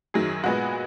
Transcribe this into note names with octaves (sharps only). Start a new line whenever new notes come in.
F#2 D#3 F#3 G#4
A#2 G#3 B3 F#4